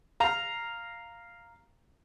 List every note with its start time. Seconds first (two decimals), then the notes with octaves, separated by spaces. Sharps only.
0.20 F5 A#5